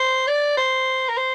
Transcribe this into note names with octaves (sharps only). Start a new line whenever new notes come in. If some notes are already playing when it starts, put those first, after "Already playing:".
Already playing: C5
D5
C5
A#4
C5